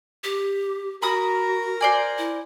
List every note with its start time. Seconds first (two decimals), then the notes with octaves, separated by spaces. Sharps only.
0.24 G4
1.02 F#4 A#4 A#5 B5 D#6
1.81 C5 D5 G#5
2.18 E4